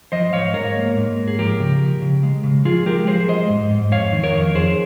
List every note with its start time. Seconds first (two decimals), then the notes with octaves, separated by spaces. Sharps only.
0.12 F3 C5 D#5
0.33 G#2 C#5 F5
0.54 G#2 A#4 C#5
0.76 A#3
0.97 G#2
1.17 A#3
1.28 G#4
1.39 F3 G4 A#4
1.60 C#3
1.81 F3
2.02 C#3
2.23 G#3
2.44 C#3
2.65 F3 F4 G#4
2.86 G#3 G4 A#4
3.07 F3 G#4 C5
3.28 G#3 C5 D#5
3.50 G#2
3.71 G#2
3.91 F2 C#5 F5
4.13 D#3
4.23 A#4 C#5
4.34 F2
4.55 F2 G#4 C5